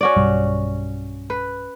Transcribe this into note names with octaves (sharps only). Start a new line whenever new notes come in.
C#4 F#4 D5
B1 G2 G3
B4